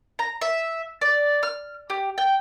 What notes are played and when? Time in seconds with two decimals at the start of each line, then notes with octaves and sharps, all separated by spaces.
0.19 A#5
0.41 E5
1.01 D5
1.43 F6
1.90 G4
2.18 G5